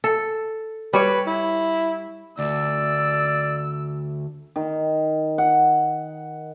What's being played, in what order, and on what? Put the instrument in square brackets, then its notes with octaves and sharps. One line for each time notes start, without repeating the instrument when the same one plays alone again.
[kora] A4
[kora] G3 C#5 [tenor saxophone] B4
[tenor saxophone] E4
[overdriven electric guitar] D2 [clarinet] D5 [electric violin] E6
[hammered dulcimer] D#3
F#5